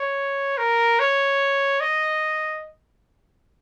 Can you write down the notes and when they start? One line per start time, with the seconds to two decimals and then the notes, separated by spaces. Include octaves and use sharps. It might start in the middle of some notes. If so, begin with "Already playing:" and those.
Already playing: C#5
0.58 A#4
0.99 C#5
1.80 D#5